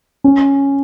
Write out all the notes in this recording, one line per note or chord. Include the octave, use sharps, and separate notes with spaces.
C#4